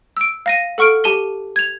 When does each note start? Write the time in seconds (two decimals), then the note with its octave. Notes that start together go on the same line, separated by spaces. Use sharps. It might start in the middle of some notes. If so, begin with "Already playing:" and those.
0.17 E6 D7
0.46 F5 A#6 D#7
0.78 A4 F#5 C#6 F6 D7
1.04 G4 A5 D#7 G7
1.56 G#6 F7